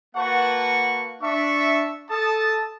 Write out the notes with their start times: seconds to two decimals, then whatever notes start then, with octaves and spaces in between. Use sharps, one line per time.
0.15 A#3 F#4 B4 F#5 A5 C#6
1.22 D4 E5 C#6
2.10 A4 A5 D#6